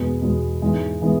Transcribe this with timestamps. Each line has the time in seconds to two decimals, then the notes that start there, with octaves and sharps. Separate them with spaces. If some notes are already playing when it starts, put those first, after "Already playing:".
Already playing: E2 B2 G#3 B3
0.21 E2 B2 G#3 B3
0.62 G#2 E3 G#3 B3
1.02 E3 G#3 B3